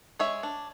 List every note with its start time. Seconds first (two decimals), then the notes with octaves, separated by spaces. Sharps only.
0.19 G#3 C#5 E5
0.43 D4